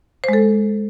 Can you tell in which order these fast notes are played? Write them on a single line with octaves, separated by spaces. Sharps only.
C5 G#3 A4